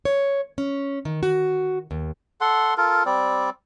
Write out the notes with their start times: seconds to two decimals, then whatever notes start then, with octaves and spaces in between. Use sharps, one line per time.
0.05 C#5
0.58 C#4
1.05 D#3
1.23 F#4
1.91 D#2
2.41 A4 F#5 C6
2.78 F4 A4 A#4
3.06 G3 C4 D5